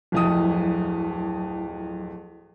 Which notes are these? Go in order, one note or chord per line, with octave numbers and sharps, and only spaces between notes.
D1 F2 F#3 E4 D#6